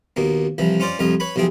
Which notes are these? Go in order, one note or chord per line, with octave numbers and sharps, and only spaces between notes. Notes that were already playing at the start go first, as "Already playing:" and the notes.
D#2 B2 A#3
C2 E3 F3
C#4 F4 C5 D5
C2 F2 F4 D#5
B4 C#5 B5
B1 C3 F3 C4 G#4